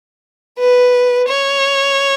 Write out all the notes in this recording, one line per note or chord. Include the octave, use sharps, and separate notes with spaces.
B4
C#5